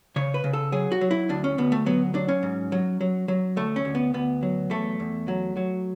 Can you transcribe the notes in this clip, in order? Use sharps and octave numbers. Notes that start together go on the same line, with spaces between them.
C#3 C#5
B4
C#3
A4
F#3 G#4
F#4
F#3
E4
D2 D4
C#4
D2 B3
A3
F#3 B3
F#3 D4
C#4
G#2
F#3
F#3
F#3
D2 A3
C#4
D2
B3
D2 B3
F#3
E2 A3
E2
F#3
F#3